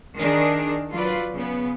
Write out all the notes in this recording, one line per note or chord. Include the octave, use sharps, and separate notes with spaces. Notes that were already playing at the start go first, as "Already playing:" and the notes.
D#3 D4 G#4 A#4
F#3 F4 B4 D5
C#3 B3